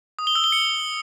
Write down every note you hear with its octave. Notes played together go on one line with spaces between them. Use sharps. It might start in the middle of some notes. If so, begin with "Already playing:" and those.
D#6
G7
E6
G7
C#7